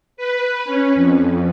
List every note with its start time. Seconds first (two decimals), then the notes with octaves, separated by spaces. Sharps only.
0.17 B4
0.65 C#4
0.95 F2